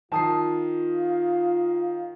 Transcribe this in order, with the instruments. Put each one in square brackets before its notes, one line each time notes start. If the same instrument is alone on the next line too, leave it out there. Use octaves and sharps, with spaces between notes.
[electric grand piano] D#3 D#6 C7 [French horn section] F4 [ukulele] A5
[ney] F5